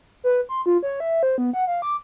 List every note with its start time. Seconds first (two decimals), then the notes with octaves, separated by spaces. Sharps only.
0.24 B4
0.49 C6
0.66 F4
0.83 C#5
1.00 E5
1.23 C5
1.38 B3
1.53 F#5
1.67 F5
1.82 D6